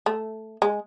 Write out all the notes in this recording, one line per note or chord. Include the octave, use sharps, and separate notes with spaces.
A3
G#3